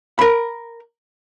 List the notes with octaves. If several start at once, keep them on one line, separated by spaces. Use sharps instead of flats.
A#4 B5